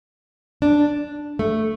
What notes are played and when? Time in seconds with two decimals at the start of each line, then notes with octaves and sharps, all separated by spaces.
0.62 D4
1.39 A3